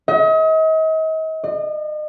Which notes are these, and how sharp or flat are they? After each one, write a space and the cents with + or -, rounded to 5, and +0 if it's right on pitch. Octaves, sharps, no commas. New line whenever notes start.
D#5 +40
D#5 -40